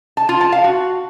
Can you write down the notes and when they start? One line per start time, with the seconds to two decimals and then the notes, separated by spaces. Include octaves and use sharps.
0.17 A5
0.29 F4
0.41 A5
0.52 F5
0.64 F#4